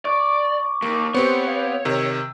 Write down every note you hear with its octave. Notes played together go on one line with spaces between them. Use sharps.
D5 C#6 D6
D#2 A#3
B3 C4 G4 C5 C#5
F5
C3 D#3 E6